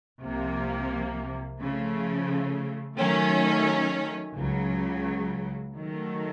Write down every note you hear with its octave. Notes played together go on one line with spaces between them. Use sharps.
C2 C3 F3 A#3
C#3 F3 A3
D#3 F#3 A3 C#4
C#2 C#3 F#3
D#3 F#3 A3